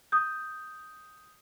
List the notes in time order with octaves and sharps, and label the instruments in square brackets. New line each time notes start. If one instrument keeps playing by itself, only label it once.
[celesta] D#6 G6